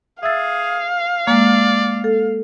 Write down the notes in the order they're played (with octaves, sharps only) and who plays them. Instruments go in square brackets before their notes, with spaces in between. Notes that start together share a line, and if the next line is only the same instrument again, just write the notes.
[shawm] G#4 [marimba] E5 E6 A6 [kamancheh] F5
[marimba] G#3 A#3 [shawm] D5
[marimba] A4